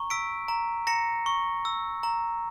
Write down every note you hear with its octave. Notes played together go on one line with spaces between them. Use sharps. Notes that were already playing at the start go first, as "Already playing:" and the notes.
Already playing: A#5 C#6
E6 B6 D7
A#5
A#5 A#6 C#7
C#6
E6
A#5